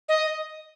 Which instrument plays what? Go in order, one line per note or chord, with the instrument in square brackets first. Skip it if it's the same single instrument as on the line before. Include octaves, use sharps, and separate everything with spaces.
[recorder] D#5